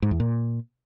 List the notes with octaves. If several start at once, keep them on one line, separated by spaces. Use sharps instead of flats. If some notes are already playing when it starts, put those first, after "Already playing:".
G#2
E2
A#2